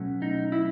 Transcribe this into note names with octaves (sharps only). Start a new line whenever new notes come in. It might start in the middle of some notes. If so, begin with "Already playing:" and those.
Already playing: B2 F#3 A3 C#4
D#4
E4